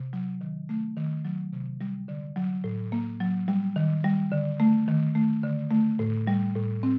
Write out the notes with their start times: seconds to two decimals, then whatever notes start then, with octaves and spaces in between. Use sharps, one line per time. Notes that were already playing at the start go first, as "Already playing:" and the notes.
Already playing: C3
0.13 F#3
0.41 D#3
0.69 A3
0.97 D#3
1.25 F#3
1.53 C3
1.81 G3
2.08 D3
2.36 F#3
2.64 A2
2.92 A#3
3.20 F#3
3.48 G3
3.76 D#3
4.04 G3
4.32 D3
4.60 A3
4.88 D#3
5.15 A3
5.43 D3
5.71 A3
5.99 A2
6.27 G3
6.55 A2
6.83 C4